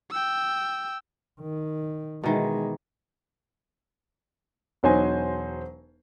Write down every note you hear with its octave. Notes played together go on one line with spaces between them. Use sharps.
G5 E6
D#3
B2 D#3 E3 G#3
E1 F#3 D#4 C5 G#5